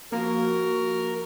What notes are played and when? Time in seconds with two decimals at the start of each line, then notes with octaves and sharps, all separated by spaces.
0.12 F3 A#3 F#4 A#4